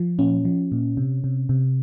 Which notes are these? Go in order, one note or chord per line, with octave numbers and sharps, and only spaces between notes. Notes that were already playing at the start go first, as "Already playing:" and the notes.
Already playing: F3
A#2 C#4
F3
A#2
C3
C3
C3